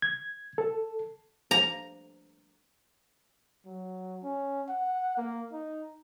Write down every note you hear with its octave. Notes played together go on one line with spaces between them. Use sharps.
G#6
A4
A#5
F#3
C#4
F#5
A#3
D#4